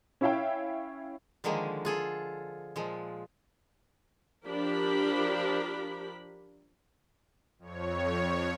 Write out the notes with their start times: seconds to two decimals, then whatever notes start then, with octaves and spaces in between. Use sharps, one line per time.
0.21 C#4 E4 C#5 E5 F5 G5
1.44 D3 D#3 F3 G#3 A#3
1.85 F4 G#4 A4
2.76 A#2 F3 G#3
4.46 F3 D4 G4 A#4 B5
7.59 F2 C#5